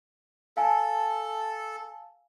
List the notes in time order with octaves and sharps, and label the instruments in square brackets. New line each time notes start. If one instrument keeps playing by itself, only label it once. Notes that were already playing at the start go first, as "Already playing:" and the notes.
[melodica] A4 [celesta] F5 G#5 A5